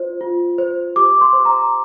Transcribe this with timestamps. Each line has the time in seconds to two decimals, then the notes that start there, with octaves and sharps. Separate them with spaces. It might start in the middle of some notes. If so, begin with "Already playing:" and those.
Already playing: F4 C5
0.21 F4
0.58 C5
0.96 G4 D6
1.21 C6
1.33 C5
1.45 A#5